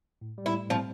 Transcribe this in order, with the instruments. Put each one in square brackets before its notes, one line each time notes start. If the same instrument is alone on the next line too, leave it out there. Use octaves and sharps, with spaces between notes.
[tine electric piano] A2
G3
[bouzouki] E4
[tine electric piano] A2
[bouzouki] F3 [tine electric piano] C4